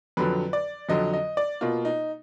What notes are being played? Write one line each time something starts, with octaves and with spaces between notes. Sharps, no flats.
F2 D3 F#3 B4
D5
F2 D3 F#3 D#5
D#5
D5
B2 A#3 F4
D#4